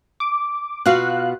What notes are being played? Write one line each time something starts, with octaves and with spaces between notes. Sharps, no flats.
D6
B2 F4 F#4 F5 F#6